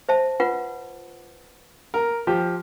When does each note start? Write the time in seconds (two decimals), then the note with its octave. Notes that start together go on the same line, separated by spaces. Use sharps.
0.09 C5 E5 A5
0.40 F4 B4 F#5
1.94 A#4
2.27 F3 G4